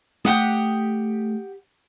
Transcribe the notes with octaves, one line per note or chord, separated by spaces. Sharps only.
A3 G4 F#5 D#6